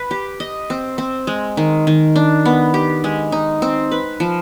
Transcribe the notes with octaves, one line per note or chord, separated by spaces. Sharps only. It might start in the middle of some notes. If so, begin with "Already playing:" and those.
Already playing: B4
G4
D#5
C4
C4
G#3
D#3
D#3
D4
B3
G4
G#3
D#4
C4
B4
F3